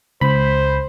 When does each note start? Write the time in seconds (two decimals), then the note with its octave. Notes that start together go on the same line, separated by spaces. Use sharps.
0.21 C#2 C5 B5